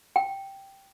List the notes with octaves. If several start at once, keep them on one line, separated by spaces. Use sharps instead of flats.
G5